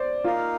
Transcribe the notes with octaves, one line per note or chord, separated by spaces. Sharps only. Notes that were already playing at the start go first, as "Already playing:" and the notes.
Already playing: C5 D5
A#3 D#4 F4 A#4 F5